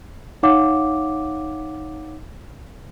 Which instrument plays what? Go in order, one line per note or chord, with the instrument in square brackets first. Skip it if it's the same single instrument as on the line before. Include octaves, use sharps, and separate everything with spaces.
[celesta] D#4 C#5 F5 F#5 D6